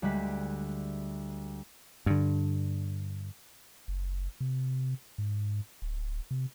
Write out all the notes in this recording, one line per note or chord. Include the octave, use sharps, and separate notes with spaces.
D2 G3 G#3 F#6 B6
G2 D3
F#1
C3
G#2
D1
C3